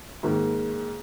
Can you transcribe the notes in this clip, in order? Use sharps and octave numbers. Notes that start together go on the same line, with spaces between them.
G#2 D#3 A#3